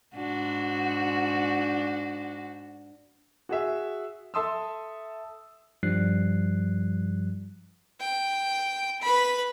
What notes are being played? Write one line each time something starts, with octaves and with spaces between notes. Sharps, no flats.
G#2 D4 F#4
F#4 G#4 E5
A4 E5 A5 C6 D#6 E6
G2 F3 G3 F#6 C7
G5
B4 B5